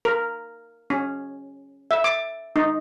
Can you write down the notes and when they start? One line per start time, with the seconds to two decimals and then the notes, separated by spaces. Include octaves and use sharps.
0.05 A#4
0.90 C#4
1.91 E5
2.04 D6
2.56 D#4